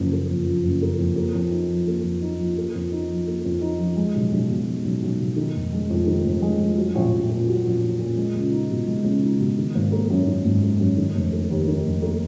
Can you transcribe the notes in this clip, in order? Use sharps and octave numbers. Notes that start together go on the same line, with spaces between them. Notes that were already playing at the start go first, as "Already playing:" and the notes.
Already playing: F#1 F3
A#3
F2
F3
F#1
A#3
F2
A#3
F2
D#4
F3
A#3
F2
D#4
F3
A#3
F2
D#4
F3
A#3
F2
D#4
F3
G#3
B1
B1
B2
G#3
B1
B1
B2
D#3
F1
G#3
F2
D#3
F1
G#3
F2
F#3
A#1
A#1
A#2
F#3
A#1
A#1
A#2
G#3
C#2
D#4
B2
G#3
C#2
D#4
B2
D#3
G#1
A#3
F#2
D#3
G#1
A#3
F#2
D#3
F1
A#3
D#2
D#3
F1
A#3